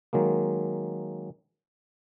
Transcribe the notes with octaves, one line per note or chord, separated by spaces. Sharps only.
D#3 F#3 G#3 A#3